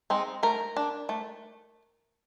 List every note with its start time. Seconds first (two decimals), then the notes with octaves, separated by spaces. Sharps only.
0.10 G#3 C4 D#4
0.43 A3 A#4
0.76 D4
1.09 A3